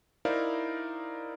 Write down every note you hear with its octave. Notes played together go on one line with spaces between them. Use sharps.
D#4 E4 A#4 C5 D5 F5